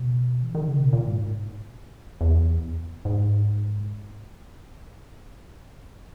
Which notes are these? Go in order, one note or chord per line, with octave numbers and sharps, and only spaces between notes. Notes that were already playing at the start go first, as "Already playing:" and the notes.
Already playing: B2
E3
D#3
C#3
B2
A#2
G#2
E2
G#2